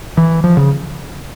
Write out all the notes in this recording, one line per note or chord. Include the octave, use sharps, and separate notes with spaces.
E3
F3
C#3